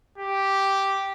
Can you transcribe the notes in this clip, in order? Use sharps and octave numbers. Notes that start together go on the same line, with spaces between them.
G4